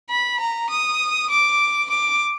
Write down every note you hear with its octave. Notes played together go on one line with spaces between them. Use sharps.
B5
A#5
D#6
D6
D6